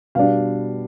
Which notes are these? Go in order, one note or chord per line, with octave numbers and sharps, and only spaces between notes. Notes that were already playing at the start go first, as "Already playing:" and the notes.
B2 G3 B3 D4 F5